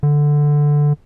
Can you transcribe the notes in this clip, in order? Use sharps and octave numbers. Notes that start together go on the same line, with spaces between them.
D3